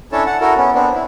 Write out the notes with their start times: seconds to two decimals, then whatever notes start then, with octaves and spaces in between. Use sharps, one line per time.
0.12 C#4 D4 E4 A4 C#5 A5
0.26 F#5 A5
0.41 E4 F#4 A4 A#4
0.57 B3 C#4
0.75 B3 C4 D4
0.94 E4